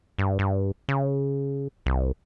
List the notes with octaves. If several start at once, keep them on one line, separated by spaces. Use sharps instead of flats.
G2
G2
C#3
C2